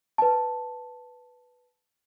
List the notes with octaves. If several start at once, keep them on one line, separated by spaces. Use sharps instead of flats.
B4 A5